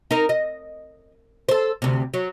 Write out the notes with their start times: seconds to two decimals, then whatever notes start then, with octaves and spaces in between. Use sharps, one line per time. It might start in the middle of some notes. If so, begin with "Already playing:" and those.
0.11 D#4 A#4
0.29 D#5
1.49 A4 C5
1.82 D2 C3
2.14 F#3